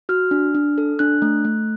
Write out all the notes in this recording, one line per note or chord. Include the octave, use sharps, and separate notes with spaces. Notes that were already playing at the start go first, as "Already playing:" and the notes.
F#4 F6
D4
D4
A4
D4 F#6
A3
A3